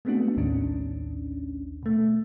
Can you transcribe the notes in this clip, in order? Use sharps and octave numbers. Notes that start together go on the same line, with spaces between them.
G#3 A3 B3 C4 D4 F#4
A#1 D#2 A2 D#3 C#4 D4
B2 A3